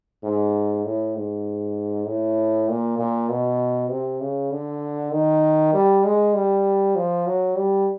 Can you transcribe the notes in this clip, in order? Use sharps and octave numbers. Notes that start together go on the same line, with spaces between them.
G#2
A2
G#2
A2
A#2
A#2
B2
C3
C#3
D3
D#3
G3
G#3
G3
F3
F#3
G3